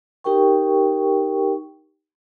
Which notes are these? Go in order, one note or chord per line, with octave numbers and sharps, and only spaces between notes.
D#4 G4 A#4 G5 C#6